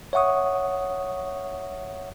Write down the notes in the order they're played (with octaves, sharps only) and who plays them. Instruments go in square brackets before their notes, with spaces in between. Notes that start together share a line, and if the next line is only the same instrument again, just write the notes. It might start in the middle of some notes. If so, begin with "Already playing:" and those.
[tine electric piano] C#5 E5 F#5 C#6 D#6